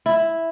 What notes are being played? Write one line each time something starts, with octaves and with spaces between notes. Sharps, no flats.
E4